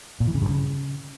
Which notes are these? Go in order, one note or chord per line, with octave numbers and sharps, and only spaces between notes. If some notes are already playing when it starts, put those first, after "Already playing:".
A#2
E3
C#3
G2
C#3